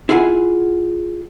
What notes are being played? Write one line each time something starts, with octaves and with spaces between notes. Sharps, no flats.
E4 F4 G#4 F#5 G#5